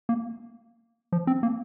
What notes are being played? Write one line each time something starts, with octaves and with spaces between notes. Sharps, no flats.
A#3
F3
C4
A#3